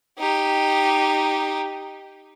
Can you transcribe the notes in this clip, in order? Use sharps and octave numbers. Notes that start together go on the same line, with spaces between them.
D#4 G4